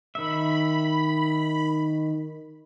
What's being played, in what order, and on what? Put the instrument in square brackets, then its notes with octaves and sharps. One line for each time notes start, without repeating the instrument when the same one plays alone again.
[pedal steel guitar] D#3 E5 [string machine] B5